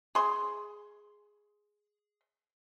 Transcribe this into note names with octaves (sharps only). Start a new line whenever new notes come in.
G#4 C6